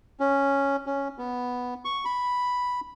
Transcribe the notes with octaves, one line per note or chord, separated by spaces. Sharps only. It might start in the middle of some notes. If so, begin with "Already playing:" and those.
C#4
C#4
B3
C#6
B5